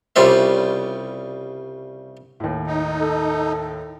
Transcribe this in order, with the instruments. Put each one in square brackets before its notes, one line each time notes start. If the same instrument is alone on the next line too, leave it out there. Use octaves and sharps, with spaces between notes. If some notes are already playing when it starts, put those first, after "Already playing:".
[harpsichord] C2 C#3 G3 F4 C5 E5
[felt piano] D#2 A2
[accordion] D#4
[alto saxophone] A4